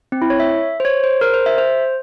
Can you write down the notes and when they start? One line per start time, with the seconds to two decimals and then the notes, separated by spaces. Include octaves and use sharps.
0.12 C4
0.22 E4
0.30 C#5
0.40 E5
0.80 C5
0.85 C#5
1.04 C5
1.21 A#4
1.34 C5
1.46 E5
1.58 C5